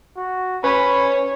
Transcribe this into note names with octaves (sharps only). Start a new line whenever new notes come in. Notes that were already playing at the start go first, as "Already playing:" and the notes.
F#4
C#4 B4 C#5 B5